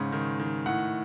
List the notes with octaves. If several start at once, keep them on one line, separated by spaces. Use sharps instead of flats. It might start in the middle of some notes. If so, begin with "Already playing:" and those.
Already playing: G#2 C#3
D#3
D#3
A2 F#5